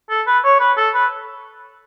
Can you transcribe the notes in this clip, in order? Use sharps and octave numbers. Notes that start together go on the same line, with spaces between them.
A4
B4
C#5
B4
A4
B4